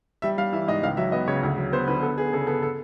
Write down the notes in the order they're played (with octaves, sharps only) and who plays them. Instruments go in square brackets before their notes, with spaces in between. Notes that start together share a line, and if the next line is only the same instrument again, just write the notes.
[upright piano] G3 E5
G3 F5
E3 E5
G#2 D#5
C#2 F5
F#3 E5
B3 D#5
C#3 C#5
D2
F#3
B3 C5
D3 B4
B3 A4
B3 G#4
C#3 A4
B3 A4
A4